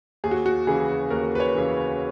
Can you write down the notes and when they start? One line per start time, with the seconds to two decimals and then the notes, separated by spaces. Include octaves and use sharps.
0.24 D#2 G#4
0.31 F#4
0.46 F#4
0.67 C#3 E3 G#4
1.10 D#2 A#4
1.35 B4
1.40 C#5
1.55 C#3 E3